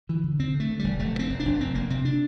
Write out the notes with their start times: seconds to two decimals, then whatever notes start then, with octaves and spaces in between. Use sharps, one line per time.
0.09 D3 E3
0.24 D3
0.40 D3 C4
0.54 D3
0.60 A3
0.70 D3
0.79 E1 G3
0.99 F1 A3
1.14 C3
1.19 C4
1.30 F1
1.40 D4
1.45 F1
1.60 F1 C4
1.74 F1 A#3
1.90 C3 C4
2.05 D4